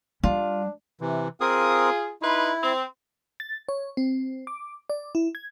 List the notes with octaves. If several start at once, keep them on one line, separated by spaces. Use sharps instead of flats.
G3 D4 F4
C3 E3
C4 F4 G#4 A#4 D#6
D#4 E4 B4 C6
C4
A6
C#5
C4
D6
D5
E4
G#6